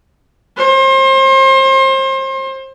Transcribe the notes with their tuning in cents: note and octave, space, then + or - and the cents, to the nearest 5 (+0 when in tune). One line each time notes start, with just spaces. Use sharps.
C5 +35